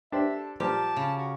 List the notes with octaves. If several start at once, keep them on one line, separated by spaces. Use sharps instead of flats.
D4 G4 C5 E5
A4
A#2 F3 G3 G4 A5
C#3
F#4